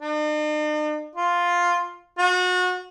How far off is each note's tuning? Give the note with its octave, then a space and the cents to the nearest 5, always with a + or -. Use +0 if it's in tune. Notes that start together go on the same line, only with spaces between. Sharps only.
D#4 -45
F4 +5
F#4 -30